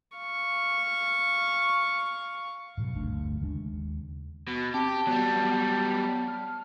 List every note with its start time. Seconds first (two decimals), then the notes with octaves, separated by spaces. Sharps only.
0.17 F5 C#6
2.77 G#2 B2 F#3
2.95 G1 D2 A3 D4
3.42 D#2 C#3 G#3 D4
4.47 B2
4.74 C4 G4 A5
5.07 F#3 G3 B3
6.28 F6